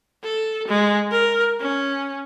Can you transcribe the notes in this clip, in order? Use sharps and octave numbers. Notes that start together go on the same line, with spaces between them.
A4
G#3
A#4
C#4